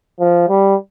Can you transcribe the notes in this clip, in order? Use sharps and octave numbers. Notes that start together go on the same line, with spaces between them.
F3
G3